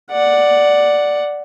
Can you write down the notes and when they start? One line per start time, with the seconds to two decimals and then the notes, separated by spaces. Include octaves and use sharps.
0.12 D5 F#5